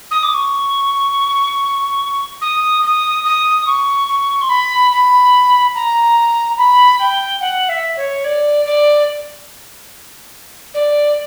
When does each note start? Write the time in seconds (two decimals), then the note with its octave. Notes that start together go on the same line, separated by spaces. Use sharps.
0.11 D#6
0.23 D6
0.34 C#6
2.41 D#6
2.83 D#6
3.25 D#6
3.66 C#6
4.08 C#6
4.41 C6
4.49 B5
4.91 B5
5.75 A#5
6.58 B5
7.00 G5
7.41 F#5
7.69 E5
7.97 C#5
8.25 D5
8.65 D5
10.74 D5